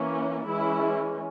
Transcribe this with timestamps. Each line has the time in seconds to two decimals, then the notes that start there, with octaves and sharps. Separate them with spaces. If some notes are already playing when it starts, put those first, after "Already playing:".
Already playing: E3 A#3 C#4
0.46 E3 G#3 C#4 E4